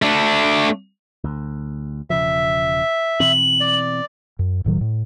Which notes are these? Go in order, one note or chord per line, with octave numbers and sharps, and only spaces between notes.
A3 D4
D2
E1 C#3 F3 E5
B2 E3 C4 F#7
D5
F#2
D1 A2 D#3 F#3
A2